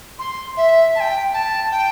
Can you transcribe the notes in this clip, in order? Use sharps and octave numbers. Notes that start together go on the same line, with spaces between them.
C6
E5
A5
G5
A5
G5